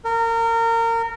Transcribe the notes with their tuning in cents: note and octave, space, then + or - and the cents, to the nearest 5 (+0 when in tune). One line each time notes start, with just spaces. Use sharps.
A#4 -25